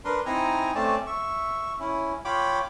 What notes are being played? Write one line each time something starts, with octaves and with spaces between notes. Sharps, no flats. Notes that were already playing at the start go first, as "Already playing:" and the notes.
D4 A#4 B4 C6
C4 D#4 E4 G#5 A#5
A3 C4 C#4 D5 A5
E5 C#6
C#4 E4
F4 C#5 G5 B5 D6